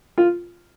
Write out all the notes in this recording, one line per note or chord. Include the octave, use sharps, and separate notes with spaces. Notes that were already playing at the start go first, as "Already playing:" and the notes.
F4